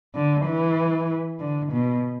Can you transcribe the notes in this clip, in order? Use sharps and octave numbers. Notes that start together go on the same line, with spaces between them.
D3
E3
D3
B2